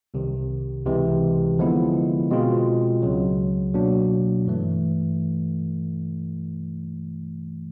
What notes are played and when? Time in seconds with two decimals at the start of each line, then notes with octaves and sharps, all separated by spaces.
0.14 C2 C3 D#3
0.86 C#2 C3 E3 G#3
1.58 D3 F3 G#3 B3 E4
2.31 B2 G#3 C4 F4
3.02 C#2 C#3 F#3
3.74 B2 F#3 A#3 D4
4.46 G2 E3 A3